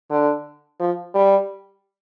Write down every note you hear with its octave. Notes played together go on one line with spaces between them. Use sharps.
D3
F3
G3